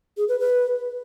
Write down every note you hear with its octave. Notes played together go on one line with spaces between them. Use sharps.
G#4
B4
B4